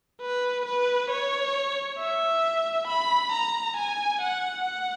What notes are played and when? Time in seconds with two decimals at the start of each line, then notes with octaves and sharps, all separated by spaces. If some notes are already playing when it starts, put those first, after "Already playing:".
0.22 B4
0.66 B4
1.10 C#5
1.99 E5
2.88 B5
3.32 A#5
3.77 G#5
4.22 F#5
4.66 F#5